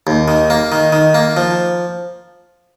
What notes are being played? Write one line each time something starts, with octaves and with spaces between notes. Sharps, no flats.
D#2
D#3
A#3
D#3
D#3
A#3
F3